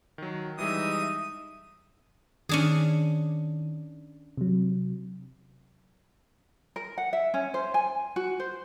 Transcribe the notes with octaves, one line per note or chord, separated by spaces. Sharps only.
D#3 F#3
E3 G3 G#3 D#4 E5 D#6
D#3 C#4 D4 G#4
C3 F#3
A#4
F#5
E5
C#4
C5
G#5
F#4
C5